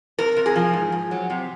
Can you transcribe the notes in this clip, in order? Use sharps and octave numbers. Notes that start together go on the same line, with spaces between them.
C3 A#4
C3
G#4
F3
G#2
G#2
F#3
C3